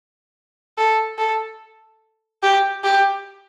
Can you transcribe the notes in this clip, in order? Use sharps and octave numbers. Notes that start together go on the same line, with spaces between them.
A4
A4
G4
G4